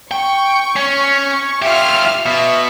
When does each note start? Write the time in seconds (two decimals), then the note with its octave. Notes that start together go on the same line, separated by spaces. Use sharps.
0.11 G5 C#6
0.76 C#4
1.62 F4 G4 E5 F6
2.26 B2 E5